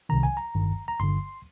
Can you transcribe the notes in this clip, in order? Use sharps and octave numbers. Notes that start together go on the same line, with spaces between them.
C2 C3 D#3 A#5
G#5
A#5
G1 G2 D#3
A#5
G1 G2 D3 C6